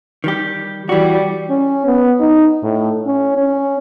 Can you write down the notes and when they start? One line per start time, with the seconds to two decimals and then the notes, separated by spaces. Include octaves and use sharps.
0.24 D#3 G3 G4
0.89 E3 G3 F#4
1.50 C#4
1.86 B3
2.20 D#4
2.63 A2
3.06 C#4
3.37 C#4